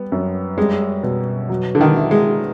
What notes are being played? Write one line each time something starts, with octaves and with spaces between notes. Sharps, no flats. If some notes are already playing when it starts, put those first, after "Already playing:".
Already playing: G3 B3
F#2
G3 G#3
B2
F#3
D3
D#3
E4
G#3